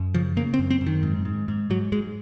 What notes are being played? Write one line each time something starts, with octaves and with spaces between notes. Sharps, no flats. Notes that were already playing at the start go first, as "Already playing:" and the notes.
Already playing: F#2
C#3 F3
C#3 A#3
C4
F#2
C4
F#2
D#3
G#2
G#2
G#2
G#2 F#3
G#2 G#3